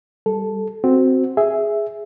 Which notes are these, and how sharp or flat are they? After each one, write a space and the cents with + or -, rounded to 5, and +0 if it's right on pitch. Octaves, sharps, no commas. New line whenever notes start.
G3 +0 A4 +0
C4 +0 F#4 +0
G#4 +0 E5 +0